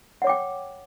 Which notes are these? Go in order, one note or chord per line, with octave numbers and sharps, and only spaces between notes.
C#5 F#5 G5 D6